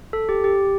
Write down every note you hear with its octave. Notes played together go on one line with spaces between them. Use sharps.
A4
G4
G4